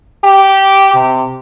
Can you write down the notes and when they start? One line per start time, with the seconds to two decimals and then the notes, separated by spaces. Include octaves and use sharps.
0.24 G4
0.94 C3